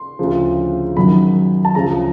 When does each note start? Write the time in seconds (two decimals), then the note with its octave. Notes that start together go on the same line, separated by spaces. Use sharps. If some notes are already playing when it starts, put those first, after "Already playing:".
Already playing: C6
0.19 D2 C#3 F3
0.97 F#2 D#3 F#3 B5
1.65 A5
1.75 D2 C#3 F3 A#5